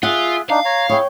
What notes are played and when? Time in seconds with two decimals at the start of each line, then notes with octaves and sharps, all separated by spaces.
0.03 F4 G#4 E5 F#5
0.50 D4 D#4 F5
0.65 C#5 A#5
0.89 E4 G#4 C#5 G5